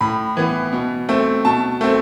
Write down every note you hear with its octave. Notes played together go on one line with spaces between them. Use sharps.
A2 B5
E3 B3
B2
A3 C4
B2 A5
A3 C4